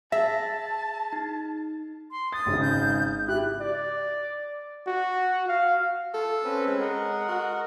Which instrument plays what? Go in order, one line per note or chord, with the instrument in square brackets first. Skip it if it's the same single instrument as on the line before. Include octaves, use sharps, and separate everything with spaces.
[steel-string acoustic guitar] G#4 [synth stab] E5 [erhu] A5 [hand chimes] A#6 B6
[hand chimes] D#4
[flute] C6
[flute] D#6 [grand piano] A6
[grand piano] G#1 C#3 D#4
[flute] G6
[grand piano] E4 G4 [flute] F#6
[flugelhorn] D5
F#4
F5
[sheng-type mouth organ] F4 [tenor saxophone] A4
[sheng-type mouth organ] C4 C#4 B4
[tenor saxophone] G#3
[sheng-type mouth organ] A#4 D#5 F#5
[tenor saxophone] F#4